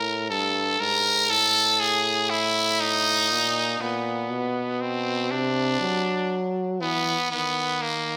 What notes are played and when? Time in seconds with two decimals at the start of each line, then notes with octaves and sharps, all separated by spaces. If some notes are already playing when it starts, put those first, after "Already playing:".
Already playing: A2 A#4
0.30 G2 A4
0.80 G#2 A#4
1.30 A2 A4
1.80 G#4
2.30 E4
2.80 D#4
3.31 A#2
3.80 A#2 B3
4.30 B2
4.81 C4
5.31 C3 D4
5.81 F#3
6.81 E3 B3
7.31 D#3 B3
7.82 A#3